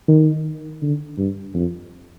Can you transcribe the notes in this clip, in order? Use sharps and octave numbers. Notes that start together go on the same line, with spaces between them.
D#3
D3
G2
F2